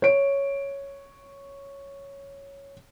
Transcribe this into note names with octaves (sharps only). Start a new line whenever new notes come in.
C#5 D7